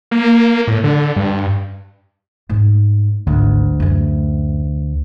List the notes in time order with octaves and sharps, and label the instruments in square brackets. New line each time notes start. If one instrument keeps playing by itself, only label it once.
[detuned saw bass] A#3
A2
D3
G2
[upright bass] G#2 A3
[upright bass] G#1 [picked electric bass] D2
[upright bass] F#2 A3